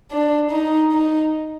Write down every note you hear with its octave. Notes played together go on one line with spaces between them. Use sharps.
D4
D#4
D#4